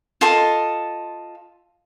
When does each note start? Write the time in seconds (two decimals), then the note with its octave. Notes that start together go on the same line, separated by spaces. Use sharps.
0.21 F4 A4 D#5